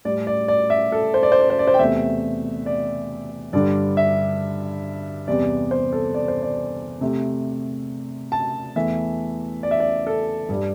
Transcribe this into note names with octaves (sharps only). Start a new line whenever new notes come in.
A2 G3 D5
D5
D5
E5
A4
C5
D5
C5
D5
C5
D5
C5
G5
E2 C3 A3 E5
D5
G2 D3 G3 D5
E5
E2 C3 G3 D5
C5
A4
D5
C5
D5
C3 A3
A5
E2 E3 A3 E5
D5
E5
D5
A4
G2 G3